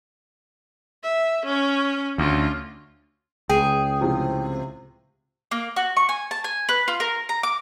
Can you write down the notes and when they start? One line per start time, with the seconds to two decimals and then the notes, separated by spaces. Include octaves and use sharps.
1.03 E5
1.46 C#4 C#5
2.18 D2 C#4 F4
3.50 C#2 G#4 G5
4.01 A2 C3 F3
5.51 A#3
5.76 F#4
5.97 C#6
6.09 G#5
6.31 A5
6.44 G#5
6.69 B4
6.88 F4
7.00 A#4
7.29 A#5
7.43 D6